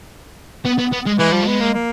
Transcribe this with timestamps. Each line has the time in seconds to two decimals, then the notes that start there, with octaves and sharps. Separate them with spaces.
0.65 B3
0.78 B3
0.92 B3
1.06 G#3
1.19 E3 G#3
1.31 F3 G3
1.43 G#3 B3
1.60 A#3
1.74 A#3